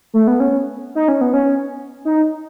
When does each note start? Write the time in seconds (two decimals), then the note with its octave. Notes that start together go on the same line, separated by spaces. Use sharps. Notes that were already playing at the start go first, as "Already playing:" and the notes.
0.14 A3
0.28 B3
0.40 C#4
0.95 D#4
1.08 C#4
1.21 B3
1.33 C#4
2.05 D#4